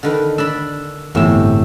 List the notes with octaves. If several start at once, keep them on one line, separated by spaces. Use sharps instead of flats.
D3 D#3 B4
D4 D5 B5 E6
G1 E2 A2 C3 E6